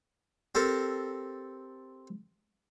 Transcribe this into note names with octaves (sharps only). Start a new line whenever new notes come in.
C4 G4 A4 A#4